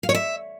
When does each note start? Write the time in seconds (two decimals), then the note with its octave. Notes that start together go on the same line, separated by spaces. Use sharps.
0.03 F5
0.09 C#5
0.15 E5